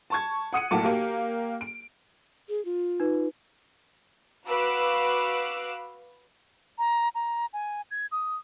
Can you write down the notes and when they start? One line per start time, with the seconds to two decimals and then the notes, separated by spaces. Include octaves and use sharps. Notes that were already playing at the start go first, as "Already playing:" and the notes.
0.10 A5 C#6 G#6
0.53 F#5 D#6 C#7 D#7
0.71 B1 A2 A#3 A5 D6
0.84 A#3 G4
1.61 D7
2.49 G#4
2.65 F4
3.00 D#4 B4
4.46 F#4 B4 F5 D6 E6 F#6
6.78 A#5
7.15 A#5
7.53 G#5
7.91 G#6
8.12 D#6